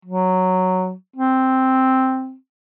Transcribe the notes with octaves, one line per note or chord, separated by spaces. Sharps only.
F#3
C4